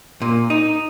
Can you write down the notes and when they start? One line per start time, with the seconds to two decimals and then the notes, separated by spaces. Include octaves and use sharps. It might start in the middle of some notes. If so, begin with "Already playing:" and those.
0.22 A#2
0.50 D#4